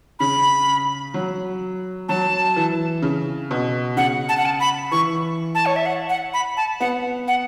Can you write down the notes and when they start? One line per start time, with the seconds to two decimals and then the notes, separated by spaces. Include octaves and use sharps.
0.19 C#3 B5
1.14 F#3
2.09 F#3 A5
2.56 E3
3.02 C#3
3.51 B2
3.97 C#3 F#5
4.29 A5
4.37 F#5
4.45 A5
4.60 B5
4.92 E3 C#6
5.55 A5
5.66 C#5
5.76 E5
5.86 F#5
6.09 F#5
6.34 B5
6.57 A5
6.80 B3 F#5
7.28 F#5